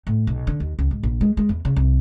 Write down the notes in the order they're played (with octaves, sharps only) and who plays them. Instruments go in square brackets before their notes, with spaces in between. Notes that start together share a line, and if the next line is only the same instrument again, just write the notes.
[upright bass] A2
B1
D3
D#2
C#2
G#2
A#1
G#3
G#3
E2
C#3
C2